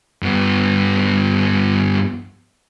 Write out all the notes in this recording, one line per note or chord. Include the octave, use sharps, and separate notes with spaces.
G2 B3